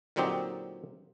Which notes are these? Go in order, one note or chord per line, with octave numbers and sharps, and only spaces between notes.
A#2 D3 F#3 C4 D#4 G4